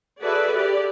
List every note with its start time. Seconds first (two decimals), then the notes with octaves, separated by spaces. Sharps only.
0.20 F#4 G#4 A4 B4 D5 E5
0.53 G4 D5